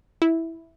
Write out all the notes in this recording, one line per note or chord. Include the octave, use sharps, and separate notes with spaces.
E4